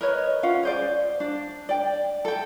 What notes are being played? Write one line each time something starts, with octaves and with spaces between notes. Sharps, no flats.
A#4 B4 C#5 D#5
C#4 F4 F5 F#5
G#4 C5 D5
D4
D5 G5
A4 G5